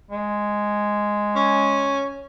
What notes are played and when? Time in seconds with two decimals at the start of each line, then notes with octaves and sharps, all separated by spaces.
0.11 G#3
1.35 C#4